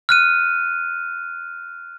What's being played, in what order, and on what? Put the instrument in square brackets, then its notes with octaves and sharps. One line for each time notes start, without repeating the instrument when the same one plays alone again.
[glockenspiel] F6 F#6 D#7